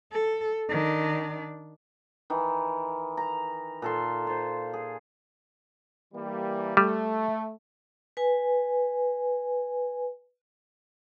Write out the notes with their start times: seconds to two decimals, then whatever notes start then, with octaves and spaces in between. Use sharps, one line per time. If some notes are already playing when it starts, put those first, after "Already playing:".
0.12 A4
0.69 D#3 D4
2.30 D#3 E3
3.17 A#5
3.82 A#2 A4 C6
4.27 F4 C5
4.73 G#4
6.14 E3 G3 A#3
6.77 G3 A3
8.17 B4 G#5